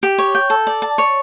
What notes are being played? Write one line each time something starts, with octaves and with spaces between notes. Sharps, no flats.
G4
C#5
G5
A4
D5
A5
C#5